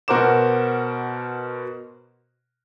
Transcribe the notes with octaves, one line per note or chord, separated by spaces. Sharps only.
B2 F#4 A#4 C5 D6 E7